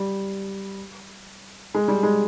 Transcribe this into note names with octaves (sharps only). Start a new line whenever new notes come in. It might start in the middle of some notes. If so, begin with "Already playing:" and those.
Already playing: G3
G#3
G3
G#3